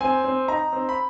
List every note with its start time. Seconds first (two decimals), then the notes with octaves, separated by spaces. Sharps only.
0.01 C4 G#5
0.24 C4
0.48 D#4 A#5
0.72 C4
0.89 B5